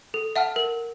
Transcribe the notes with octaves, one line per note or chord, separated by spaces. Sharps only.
A4
E5 F#5 A5 F6
A#4